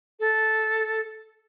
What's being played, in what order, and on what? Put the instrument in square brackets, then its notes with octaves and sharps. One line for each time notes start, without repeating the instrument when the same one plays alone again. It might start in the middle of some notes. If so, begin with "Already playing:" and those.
[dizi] A4